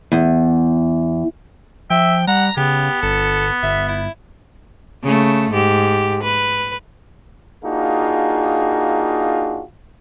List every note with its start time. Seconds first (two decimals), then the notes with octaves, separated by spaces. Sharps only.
0.12 E2
1.90 F3 E5 G5
2.27 G3 F#5 A#5
2.57 C#3 B3 G4
3.03 G1 A4
3.63 G1 E5
3.88 E4
5.04 C#3 A3
5.52 G#2 G4
6.24 B4
7.64 A#3 D4 D#4 F4 F#4 G#4